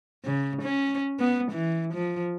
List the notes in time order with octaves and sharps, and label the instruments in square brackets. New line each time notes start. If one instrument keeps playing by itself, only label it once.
[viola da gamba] C#3
C#4
B3
E3
F3